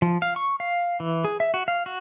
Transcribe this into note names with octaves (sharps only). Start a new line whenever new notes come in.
F3
F5
C#6
F5
E3
G#4
E5
F#4
F5
F#4